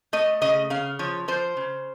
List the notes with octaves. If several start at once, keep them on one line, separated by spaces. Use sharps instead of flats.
A3 D#5
C#3 D#5
C#3 F5
F3 C#5
F3 C5
C#3